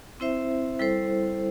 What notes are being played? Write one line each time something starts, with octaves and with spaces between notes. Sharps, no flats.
C4 E4 C5 E5
G3 E4 A4 C5